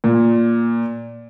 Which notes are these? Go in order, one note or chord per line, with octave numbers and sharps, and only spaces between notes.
A#2